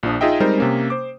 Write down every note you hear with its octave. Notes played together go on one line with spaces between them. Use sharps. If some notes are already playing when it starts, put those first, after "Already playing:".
A#1 F3 D4 D#6
D#4 F4 G#4 D#5 E5 G5
G3 G#3 C4 D#4 A#4 C5
C3 A#3 C#4
C5 D6